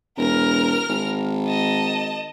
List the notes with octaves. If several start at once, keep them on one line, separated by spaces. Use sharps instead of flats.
E1 A#4 F6
G#1
D#5 A5